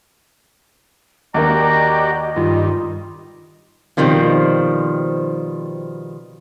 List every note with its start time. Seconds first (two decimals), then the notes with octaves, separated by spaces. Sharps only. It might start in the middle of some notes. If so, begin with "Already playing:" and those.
1.34 D#2 A#3 F#4 G4 D5 D#5 A#5
2.36 G2 D#3 F4
3.97 B2 D#3 F3 G3 C4